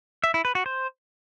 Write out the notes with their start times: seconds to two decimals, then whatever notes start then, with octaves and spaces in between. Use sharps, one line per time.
0.24 E5
0.34 E4
0.45 B4
0.55 F#4
0.66 C5